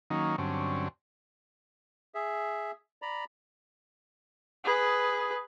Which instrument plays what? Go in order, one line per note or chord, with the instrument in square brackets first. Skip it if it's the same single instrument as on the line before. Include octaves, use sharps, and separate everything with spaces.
[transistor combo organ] D#3 F#3 A#3 C#4 D#4
G2 D3 F#3 C4 C#4
[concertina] G#4 E5
D5 A#5 B5
[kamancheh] G#4 B4